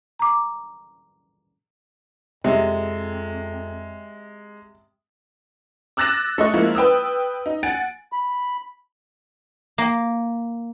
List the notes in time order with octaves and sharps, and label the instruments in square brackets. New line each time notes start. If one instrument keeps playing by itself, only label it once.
[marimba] A#5 D6
[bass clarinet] F2 [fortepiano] C3 [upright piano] G#3
[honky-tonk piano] D6 E6 F#6 A6 A#6 E7
A3 D#5 C#6
F3 G#3 A#3 E4
B4 G5 D#6 E6
D#4
F#5 G#5 A6 D7
[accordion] B5
[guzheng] A#3